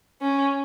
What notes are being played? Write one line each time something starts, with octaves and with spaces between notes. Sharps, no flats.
C#4